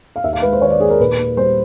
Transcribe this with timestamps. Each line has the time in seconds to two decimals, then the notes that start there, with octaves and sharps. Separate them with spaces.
0.16 F5
0.24 D#2 E5
0.33 F5
0.42 G#3 B4
0.53 C5
0.62 D#3 C#5
0.71 D5
0.80 D#2 G#4
0.90 A#4
1.00 A#2 B4
1.18 A#3
1.37 G3 C5